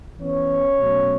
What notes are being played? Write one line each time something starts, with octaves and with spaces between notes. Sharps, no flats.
E3 B3 C#4 C#5
B2 F#3 A3 C#4